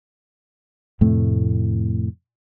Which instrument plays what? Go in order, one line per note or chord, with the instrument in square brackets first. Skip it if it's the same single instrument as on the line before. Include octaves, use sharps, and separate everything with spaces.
[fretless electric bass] F2 A2 C3 A3